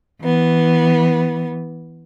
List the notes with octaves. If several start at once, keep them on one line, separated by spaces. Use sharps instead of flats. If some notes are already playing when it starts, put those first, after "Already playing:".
E3 B3